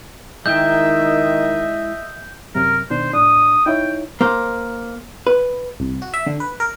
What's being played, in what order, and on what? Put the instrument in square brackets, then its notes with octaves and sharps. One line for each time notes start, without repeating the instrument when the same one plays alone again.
[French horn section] D#3 [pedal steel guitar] G#3 E4 G5 [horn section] D#5 E5 [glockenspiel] G6
[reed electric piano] F#2 C3 F#3 [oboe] A#4
[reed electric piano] B2 D#3 D4 [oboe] C5
[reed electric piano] A2 D4 [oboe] D#6
[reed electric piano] D#4 E4 C#5 [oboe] G5
[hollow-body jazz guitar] A#3 C5
B4
[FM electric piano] C2
F#4
E5
D3
B4
A#4